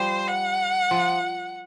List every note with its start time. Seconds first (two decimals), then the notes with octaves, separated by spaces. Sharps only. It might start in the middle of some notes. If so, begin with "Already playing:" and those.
Already playing: F3 G3 C5
0.29 F#5
0.91 F3